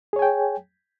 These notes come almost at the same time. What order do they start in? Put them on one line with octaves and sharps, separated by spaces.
G#4 C#5 G#5 G5